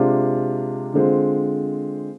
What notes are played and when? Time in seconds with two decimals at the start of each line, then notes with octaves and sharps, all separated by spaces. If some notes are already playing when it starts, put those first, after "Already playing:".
Already playing: C3 G#3 D4 F4
0.94 D3 G#3 C4 F4